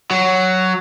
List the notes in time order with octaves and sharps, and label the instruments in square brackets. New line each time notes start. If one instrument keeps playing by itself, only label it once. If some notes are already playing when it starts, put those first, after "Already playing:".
[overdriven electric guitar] F#3